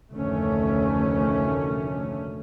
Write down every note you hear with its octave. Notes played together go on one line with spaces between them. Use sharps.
F1 D2 A#2 D#3 A3 C#4